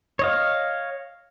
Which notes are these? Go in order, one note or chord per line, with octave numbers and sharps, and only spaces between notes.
C#5 D#5 F5